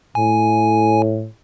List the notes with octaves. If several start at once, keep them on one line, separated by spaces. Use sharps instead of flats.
A2 G#5